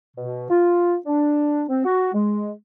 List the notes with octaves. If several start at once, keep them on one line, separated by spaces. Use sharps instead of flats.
B2
F4
D4
C4
F#4
G#3